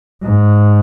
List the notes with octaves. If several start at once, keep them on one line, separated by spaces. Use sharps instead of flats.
G#2